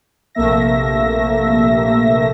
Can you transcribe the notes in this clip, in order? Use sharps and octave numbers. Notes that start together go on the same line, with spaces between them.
A#1 C3 A3 A#3 E5 A#6